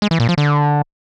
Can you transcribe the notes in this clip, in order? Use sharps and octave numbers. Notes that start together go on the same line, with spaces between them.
G#3
E3
A#2
F3
D3